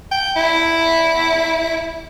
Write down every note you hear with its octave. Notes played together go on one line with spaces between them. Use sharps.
G5
E4